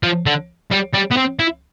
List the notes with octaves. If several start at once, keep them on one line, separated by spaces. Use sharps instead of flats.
F3
D3
G3
G3
B3
C4
E4